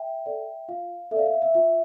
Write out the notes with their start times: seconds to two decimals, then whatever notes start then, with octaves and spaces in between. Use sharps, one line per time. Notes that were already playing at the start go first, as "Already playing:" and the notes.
Already playing: E5 G5
0.26 A4 D5
0.69 F4 F5
1.11 A4 E5
1.16 D5 F5
1.26 E5
1.33 F5
1.42 E5
1.54 F4 E5